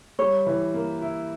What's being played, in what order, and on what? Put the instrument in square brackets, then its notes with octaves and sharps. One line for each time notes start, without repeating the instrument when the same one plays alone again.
[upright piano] G3 [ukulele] C#5
[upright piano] E3
A#3
E4